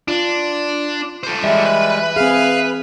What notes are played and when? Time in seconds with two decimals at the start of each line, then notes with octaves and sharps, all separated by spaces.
0.08 D4 F4
1.23 A4 C5
1.44 E3 G3 G#3 E5
1.65 B4 B5
2.16 C4 G#4 F5 F6